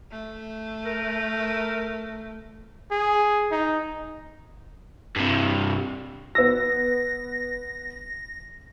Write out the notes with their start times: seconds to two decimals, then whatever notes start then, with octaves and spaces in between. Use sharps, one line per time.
0.11 A3
0.86 A#4
2.91 G#4
3.51 D#4
5.16 G2 C3
6.35 B3 E6 A#6